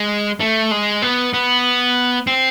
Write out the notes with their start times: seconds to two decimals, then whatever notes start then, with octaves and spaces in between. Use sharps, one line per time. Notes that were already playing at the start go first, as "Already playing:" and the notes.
Already playing: G#3
0.40 A3
0.71 G#3
1.02 B3
1.34 B3
2.27 C4